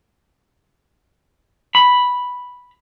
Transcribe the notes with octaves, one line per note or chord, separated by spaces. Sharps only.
B5